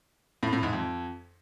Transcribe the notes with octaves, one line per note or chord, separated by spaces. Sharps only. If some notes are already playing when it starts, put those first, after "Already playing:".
A2
A2
G#2
F2